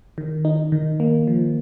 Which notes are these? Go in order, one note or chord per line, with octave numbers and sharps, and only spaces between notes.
D#3
D#4
D#3
A#3
F3